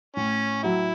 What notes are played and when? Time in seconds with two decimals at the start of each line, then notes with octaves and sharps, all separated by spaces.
0.17 A2 C#4
0.63 F#3 E4